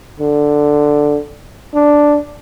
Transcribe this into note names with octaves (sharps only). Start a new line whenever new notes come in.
D3
D4